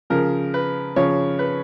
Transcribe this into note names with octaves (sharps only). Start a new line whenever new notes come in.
C#3 F3 A#4
B4
C#3 F3 C#5
B4